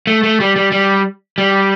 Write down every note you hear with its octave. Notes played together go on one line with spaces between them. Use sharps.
A3
A3
G3
G3
G3
G3